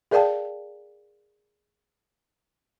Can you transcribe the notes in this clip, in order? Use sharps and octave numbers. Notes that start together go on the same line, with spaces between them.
G#4 A#4 D5 F5 G5 A5